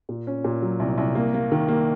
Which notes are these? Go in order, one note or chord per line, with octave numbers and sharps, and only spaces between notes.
A#2
C#4
A#2
F#3
C2
C2
A#3
A#3
D#3
A#3